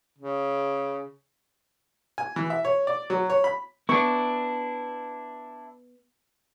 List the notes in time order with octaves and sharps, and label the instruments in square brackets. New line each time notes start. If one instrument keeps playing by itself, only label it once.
[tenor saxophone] C#3
[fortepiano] G#5
E3
E5
C#5
D5
F#3
C#5
B5
[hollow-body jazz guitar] B3 [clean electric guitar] D4 E4 [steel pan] C#6